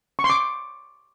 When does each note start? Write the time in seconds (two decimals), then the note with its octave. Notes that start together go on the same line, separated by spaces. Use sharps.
0.19 C#6
0.24 C6
0.30 D6